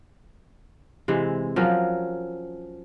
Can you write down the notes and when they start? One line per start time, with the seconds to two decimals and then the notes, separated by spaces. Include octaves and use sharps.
1.08 C3 E3 G#3
1.56 F3 F#3 C#4 A#4